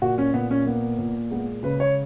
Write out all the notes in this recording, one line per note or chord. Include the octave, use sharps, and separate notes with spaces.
A#2 F#4
C#4
A#2 B3
C#4
A#3 B3
A#2
G#3 B3
C#3 B4
C#5